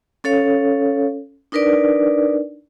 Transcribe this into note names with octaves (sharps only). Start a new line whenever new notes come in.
C#4 A4 C#5 F5
D4 D#4 A#4 B4 D5